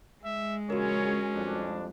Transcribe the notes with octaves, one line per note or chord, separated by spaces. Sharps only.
G#3 E5
A#1 C#3 C#4 F#4 A#4 C#5
C2 F2 D4